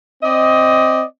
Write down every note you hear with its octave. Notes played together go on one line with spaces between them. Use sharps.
C4 D5 D#5